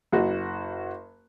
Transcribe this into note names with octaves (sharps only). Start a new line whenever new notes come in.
F#1 F#4